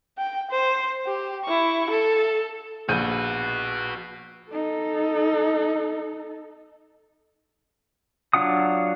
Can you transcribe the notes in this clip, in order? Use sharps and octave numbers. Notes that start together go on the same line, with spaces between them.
G5
C5
G4
E4 C#6
A4
A#1 F#4 B4 G6 D#7
D#4 A4
F#3 D4 F4 F#5 D#6